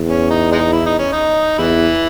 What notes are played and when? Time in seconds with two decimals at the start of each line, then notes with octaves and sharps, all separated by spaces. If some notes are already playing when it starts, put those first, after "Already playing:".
Already playing: E2
0.09 C#4
0.30 D#4
0.52 G#3 D#4
0.72 E4
0.86 D#4
0.99 C#4
1.12 D#4
1.58 E2 E3 E4